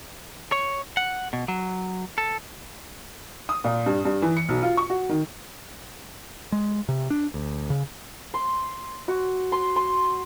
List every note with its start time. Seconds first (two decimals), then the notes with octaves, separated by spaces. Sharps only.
0.52 C#5
0.97 F#5
1.33 B2
1.48 F#3
2.18 A4
3.49 D#6
3.64 A#2
3.86 G2
4.05 G2
4.22 E3
4.37 C#7
4.49 B1
4.63 F4
4.77 C#6
4.90 F#4
5.09 D#3
6.52 G#3
6.89 C3
7.10 D4
7.34 D2
7.70 C#3
8.34 C6
9.08 F#4
9.52 C6
9.76 C6